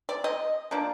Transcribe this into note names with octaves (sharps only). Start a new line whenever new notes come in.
D5
D#5
F3 A#3 D4